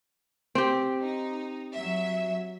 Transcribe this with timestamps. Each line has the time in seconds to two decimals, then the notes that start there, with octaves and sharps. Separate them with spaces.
0.55 C4 G4
1.02 D#4
1.73 F#3 E5